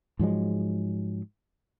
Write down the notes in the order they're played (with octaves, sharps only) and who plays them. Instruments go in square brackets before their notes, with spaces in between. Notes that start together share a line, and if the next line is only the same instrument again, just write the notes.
[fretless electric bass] G#2 F3 F#3 G#3